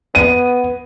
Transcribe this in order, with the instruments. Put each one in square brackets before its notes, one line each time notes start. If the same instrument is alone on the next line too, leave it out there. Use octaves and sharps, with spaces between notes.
[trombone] B3 [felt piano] D#7